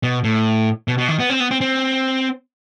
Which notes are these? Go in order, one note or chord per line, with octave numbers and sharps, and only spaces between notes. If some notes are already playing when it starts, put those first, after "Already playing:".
B2
A2
B2
B2
D#3
B3
C4
B3
C4
C4